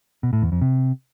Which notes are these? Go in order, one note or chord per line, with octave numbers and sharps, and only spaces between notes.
B2
A2
E2
F2
C3